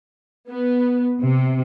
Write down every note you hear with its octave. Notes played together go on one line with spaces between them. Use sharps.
B3
C3